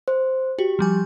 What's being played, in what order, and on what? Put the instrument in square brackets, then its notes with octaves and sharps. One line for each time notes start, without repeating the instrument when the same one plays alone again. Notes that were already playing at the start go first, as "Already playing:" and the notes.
[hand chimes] C5
[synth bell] F#4 [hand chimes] G4
[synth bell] F3 G3 G#5